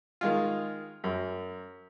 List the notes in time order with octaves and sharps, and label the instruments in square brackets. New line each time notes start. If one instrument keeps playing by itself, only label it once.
[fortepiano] D#3 G#3 F4
F#2